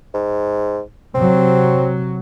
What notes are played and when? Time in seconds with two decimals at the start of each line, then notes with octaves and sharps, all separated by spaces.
0.14 G#2
1.15 C3 F#3 C4